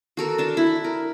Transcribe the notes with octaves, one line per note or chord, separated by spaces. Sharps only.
F#4 A4 A#4
D4 A5
E4
A#4